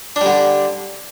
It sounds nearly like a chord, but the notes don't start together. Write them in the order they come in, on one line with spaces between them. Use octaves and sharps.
D4 G3 D3